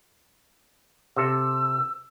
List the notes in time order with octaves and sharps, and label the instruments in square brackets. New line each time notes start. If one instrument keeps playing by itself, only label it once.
[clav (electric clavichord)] C3 A4 [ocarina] E6